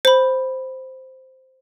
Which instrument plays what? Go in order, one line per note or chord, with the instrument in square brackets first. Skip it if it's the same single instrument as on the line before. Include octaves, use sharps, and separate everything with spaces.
[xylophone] C5 B5